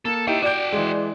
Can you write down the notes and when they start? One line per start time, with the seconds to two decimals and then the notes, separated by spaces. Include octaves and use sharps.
0.05 A#3 A4
0.27 D#4 E4 G4 C#5 G5
0.42 F#4 D5 G5 D6 G6
0.72 E3 G#3